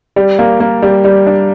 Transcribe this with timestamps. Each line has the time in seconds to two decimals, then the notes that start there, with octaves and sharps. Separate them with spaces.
0.16 G3
0.39 A#3
0.60 A#3
0.82 G3
1.04 G3
1.27 D4